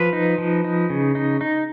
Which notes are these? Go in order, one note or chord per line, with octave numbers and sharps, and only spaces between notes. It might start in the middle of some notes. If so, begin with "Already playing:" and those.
Already playing: F3 B4
D#4
F3
D#4
C#3
D#4
D#4